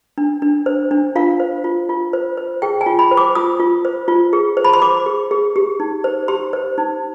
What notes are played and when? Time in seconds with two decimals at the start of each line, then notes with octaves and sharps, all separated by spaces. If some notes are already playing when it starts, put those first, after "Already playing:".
0.18 D4
0.42 D4
0.66 C5
0.91 D4
1.16 F4 F5
1.40 C5
1.64 F4
1.89 F4
2.13 C5
2.37 C5
2.62 G#4 G5
2.81 G#5
2.86 F4
2.99 B5
3.11 C5
3.17 D6
3.35 F4 D#6
3.60 F4
3.85 C5
4.08 F4
4.33 G#4
4.57 C5
4.64 B5
4.73 C6
4.82 C5 D6
5.06 G#4
5.31 G#4
5.56 G4
5.80 D#4
6.04 C5
6.28 G4 C6
6.53 C5
6.78 D#4